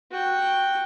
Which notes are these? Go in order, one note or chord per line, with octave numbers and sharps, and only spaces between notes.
F#4 G5